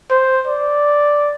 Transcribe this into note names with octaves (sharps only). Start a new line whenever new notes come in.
C5
D5